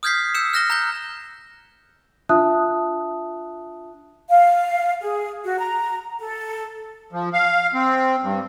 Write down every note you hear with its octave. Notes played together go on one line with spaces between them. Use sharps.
D#6 F6 G6 G#6 B6 C7
E6 G6 C#7 E7
F6 F#6 A#6 E7 G7
A#5 F#6 G6 G7
D4 F4 E5 A5 D#6 F#6
F5
G#4
F#4
A#5
A4
F3
F5
C4
G2